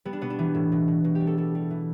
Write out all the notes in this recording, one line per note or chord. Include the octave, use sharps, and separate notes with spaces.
G3 B3
D4
B2 B3
D4
E3
A2
B2
B2
B2
G4
G3
A4
G3 A4
G3
E3